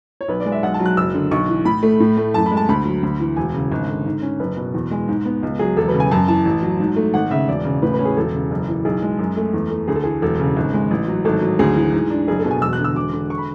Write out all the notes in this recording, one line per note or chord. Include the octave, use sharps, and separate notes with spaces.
C#5
B1 B4
D5
G#3
E5
B1 F#5
A5
F#3
F#6
F#1 E6
D3
B1 C#6
E3
A2 B5
A3
A2
A3
F#2 A5
B5
G#3
A5
D2 B5
F#3
D2
E3
E1 G#5
C#3
G#1
D3
G#2
C#4
F#1 B4
B2
E2
G#3
G#2
B3
C#2
F#3 G#4
E1 A4
B4
C#3
G#5
F#2 A5
E3 A5
A1
F#3
G#2
A3
G#1 F#5
C#3 E5
E1 D5
C#3
A2 B4
B4
C#4
G#4
E1 A4
C#3
F#1
E3
B1 G#4
G#3
F#2
A3
E2
A3
D2 G#4
A4
E3 G#4
E1 A4
C#3
G#1
G#3
A1
F#3
G#1 A4
F#3
D2 G#4
E3
G#2
D4
F#1 G#4
A4
B2
G#5
E1 E6
F#6
D3
E6
E1 D6
D3
C#6
B5